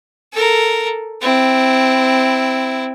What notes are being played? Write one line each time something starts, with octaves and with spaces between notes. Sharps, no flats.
A4 A#4
C4 E4